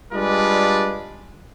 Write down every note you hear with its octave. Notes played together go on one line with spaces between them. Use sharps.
G3 G#3 D4 F4 B4 D5